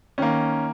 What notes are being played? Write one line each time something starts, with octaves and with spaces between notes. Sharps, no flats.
D#3 A#3 C#4